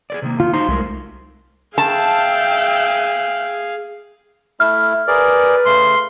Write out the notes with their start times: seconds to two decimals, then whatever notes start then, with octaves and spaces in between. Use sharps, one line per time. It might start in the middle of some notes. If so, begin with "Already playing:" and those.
0.10 G#4 A#4 D5
0.22 C3 D#3 A#3
0.40 D#3 F4
0.54 D#4 F#4 C5 F5 C6
0.68 C2 G#3 A3 A#4
1.78 G#4 E5 F5 G5 A5
4.60 A3 E4 E5 F6
5.08 G#4 A#4 B4 D5
5.65 C#3 A3 C6